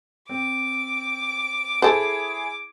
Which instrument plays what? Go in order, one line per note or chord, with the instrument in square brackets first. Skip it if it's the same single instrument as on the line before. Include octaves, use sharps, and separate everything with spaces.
[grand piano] C4 [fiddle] D6
[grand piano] E4 G#4 [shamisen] A4 C5